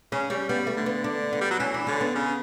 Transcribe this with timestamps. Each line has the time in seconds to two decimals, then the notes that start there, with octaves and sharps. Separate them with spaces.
0.12 C#3 C#4
0.30 G3 C#4
0.49 G3 B3
0.67 A3
0.77 D3
0.86 B3
1.04 D4
1.33 B3
1.41 G3
1.51 F#3
1.59 E3 C#4
1.74 D4
1.87 D3 C#4
2.01 B3
2.15 C#3